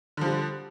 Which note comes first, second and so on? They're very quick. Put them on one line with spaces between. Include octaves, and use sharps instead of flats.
D3 F3 G3